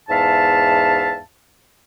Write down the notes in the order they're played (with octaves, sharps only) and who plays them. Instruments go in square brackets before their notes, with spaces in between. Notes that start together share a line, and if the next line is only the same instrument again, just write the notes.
[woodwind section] E2 G#2 E5 F5 A5